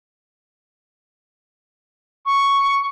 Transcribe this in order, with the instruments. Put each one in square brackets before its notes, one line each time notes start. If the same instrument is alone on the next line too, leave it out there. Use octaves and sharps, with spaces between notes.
[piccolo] C#6